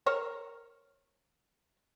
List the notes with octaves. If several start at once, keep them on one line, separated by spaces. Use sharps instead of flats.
A#4 C5 C#5